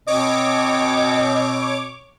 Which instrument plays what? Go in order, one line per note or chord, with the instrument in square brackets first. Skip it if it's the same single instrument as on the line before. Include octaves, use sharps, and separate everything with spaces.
[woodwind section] B2 C4 [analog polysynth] C#5 D6 [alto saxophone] D#5